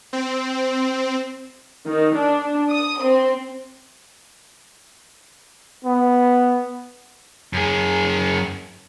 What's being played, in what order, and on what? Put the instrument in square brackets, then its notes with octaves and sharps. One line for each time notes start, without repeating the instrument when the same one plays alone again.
[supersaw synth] C4
[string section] D#3
D4
D#6
C4
[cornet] B3
[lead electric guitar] F#2 G#4